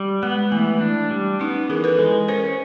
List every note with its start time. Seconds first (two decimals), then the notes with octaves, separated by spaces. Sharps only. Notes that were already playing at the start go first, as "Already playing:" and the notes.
Already playing: G3
0.23 G#3 B3
0.52 E3 A3
0.81 D4
1.11 G3
1.40 B3 C#4 D#4
1.69 E3 G#4 A#4
1.84 A4 B4
1.99 G#3
2.28 C#4 A#4 C5